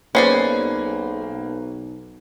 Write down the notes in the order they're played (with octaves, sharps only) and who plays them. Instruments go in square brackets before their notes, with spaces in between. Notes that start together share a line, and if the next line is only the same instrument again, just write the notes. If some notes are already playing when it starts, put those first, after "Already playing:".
[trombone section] B1 [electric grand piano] A#3 [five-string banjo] C#4 G#4 D5 [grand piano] B4 C5